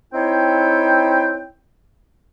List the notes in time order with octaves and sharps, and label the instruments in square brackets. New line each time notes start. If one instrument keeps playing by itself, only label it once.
[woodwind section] C4 D#4 E4 C#5 G5